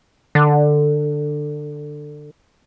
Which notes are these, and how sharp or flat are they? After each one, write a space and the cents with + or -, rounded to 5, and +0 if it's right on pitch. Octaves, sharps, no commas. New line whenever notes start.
D3 +15